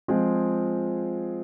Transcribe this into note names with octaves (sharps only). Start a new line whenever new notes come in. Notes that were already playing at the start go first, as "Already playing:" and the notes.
F3 G#3 C4 F4 G#4